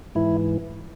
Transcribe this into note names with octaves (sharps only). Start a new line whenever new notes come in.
G#2 E3 E4